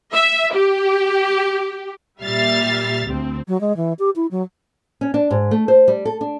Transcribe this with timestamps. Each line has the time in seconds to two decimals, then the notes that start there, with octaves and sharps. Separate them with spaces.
0.13 E5
0.53 G4
2.21 A#2 G3 E5 F6 A6 C7
3.06 D2 C4
3.47 F#3
3.61 G#3
3.77 E3
3.99 G4
4.16 E4
4.31 F#3
5.01 C#4
5.14 D4
5.30 G#2
5.51 A3
5.68 C5
5.88 G3
6.05 A4
6.21 D4